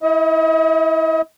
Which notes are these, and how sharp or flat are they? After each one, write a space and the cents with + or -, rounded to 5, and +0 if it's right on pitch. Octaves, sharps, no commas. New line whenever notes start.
E4 -15 D#5 +40